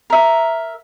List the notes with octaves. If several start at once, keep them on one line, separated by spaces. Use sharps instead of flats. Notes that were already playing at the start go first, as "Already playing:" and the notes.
A#4 E5